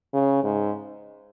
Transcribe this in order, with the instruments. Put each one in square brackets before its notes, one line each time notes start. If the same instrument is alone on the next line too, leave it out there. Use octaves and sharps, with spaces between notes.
[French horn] C#3
G#2